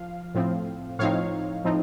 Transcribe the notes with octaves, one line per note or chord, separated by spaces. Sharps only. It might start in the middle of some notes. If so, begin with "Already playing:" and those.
Already playing: F3 F5
A2 F3 C4
A2 F3 C4 D#4 C#5 F5
A2 F3 C4 D#4